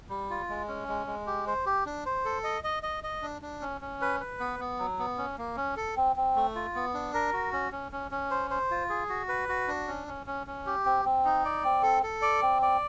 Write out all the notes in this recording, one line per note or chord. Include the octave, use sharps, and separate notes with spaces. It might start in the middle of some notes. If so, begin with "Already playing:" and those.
G3
F4
G#3
C#4
G#3
G#3
G4
C5
G4
D4
C5
A4
D#5
D#5
D#5
D#5
D4
D4
C#4
C#4
B4
B4
B3
B3
F#3
B3
C#4
A#3
C#4
A4
C4
C4
A3
F4
B3
D4
A#4
F#4
C#4
C#4
C#4
C#4
C5
C5
F4
G#4
F#4
B4
F#4
D4
C#4
C#4
C#4
C#4
G4
C4
C4
D#4
D5
C4
A4
A4
D5
C4
D5